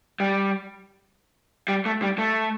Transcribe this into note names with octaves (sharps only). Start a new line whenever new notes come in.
G3
G3
A3
G3
A3